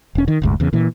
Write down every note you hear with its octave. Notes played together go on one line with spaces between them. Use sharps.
E1 C#4
D#3
F1 D2 G#2
E2 C#3
A#2 E3